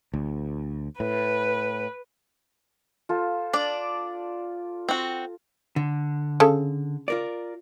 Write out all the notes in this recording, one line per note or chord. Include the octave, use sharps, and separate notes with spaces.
D2
A2 B4
F4 A4 C5
D4 D5
C4 F#4
D3
C#3 A4
F4 A#4 D5